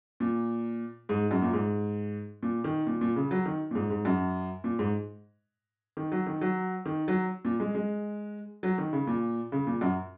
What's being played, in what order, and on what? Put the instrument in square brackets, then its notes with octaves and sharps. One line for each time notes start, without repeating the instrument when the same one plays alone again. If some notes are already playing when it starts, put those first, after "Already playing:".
[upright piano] A#2
G#2
F#2
A#2
G#2
A#2
D#3
A#2
A#2
C#3
F#3
D#3
A#2
G#2
G#2
F#2
A#2
G#2
D#3
F#3
D#3
F#3
D#3
F#3
A#2
G#3
G#3
F#3
D#3
C#3
A#2
C#3
A#2
F#2